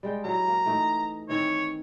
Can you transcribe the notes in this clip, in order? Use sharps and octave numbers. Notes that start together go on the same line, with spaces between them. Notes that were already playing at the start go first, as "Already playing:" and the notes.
G3 G#3 G5
F#3 E4 A#5
A#3
E3 A3 D#4
D#3 E3 C4 C#5